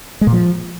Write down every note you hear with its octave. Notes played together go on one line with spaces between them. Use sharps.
G#3
A#2
F3